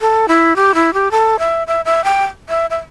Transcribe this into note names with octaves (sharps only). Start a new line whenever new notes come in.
A4
E4
G4
E4
G4
A4
E5
E5
E5
G5
E5
E5